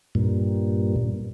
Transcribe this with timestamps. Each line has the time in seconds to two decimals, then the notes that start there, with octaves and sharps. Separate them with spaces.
0.15 G2 A#2